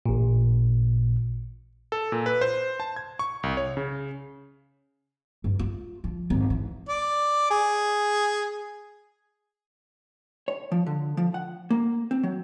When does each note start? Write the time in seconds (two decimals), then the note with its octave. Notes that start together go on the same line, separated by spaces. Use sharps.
0.06 A1 A#2
1.92 A4
2.12 A#2
2.26 B4
2.41 C5
2.80 A5
2.96 G#6
3.19 C#6
3.43 C2
3.57 C#5
3.77 C#3
5.44 G2
5.59 F4
6.04 F3
6.30 G#1
6.50 E3
6.89 D5
7.51 G#4
10.48 C#5
10.72 F3
10.86 D3
11.17 F3
11.34 F#5
11.70 A#3
12.11 C4
12.23 F#3